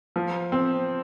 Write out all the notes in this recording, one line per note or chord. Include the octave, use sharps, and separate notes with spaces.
F3
C4